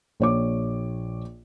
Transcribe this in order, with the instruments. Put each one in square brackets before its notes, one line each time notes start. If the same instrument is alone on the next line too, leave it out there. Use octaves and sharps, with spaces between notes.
[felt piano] A#1 C#5 D6